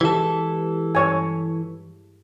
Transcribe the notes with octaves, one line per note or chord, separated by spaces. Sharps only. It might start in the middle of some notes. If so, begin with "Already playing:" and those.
E3 G#3 E4 G4 A4
G2 C#5 G#5